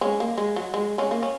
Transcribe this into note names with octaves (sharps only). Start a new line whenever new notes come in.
G#3 C#4
A#3
G#3
F#3
G#3
G#3 C#4
A#3
C#4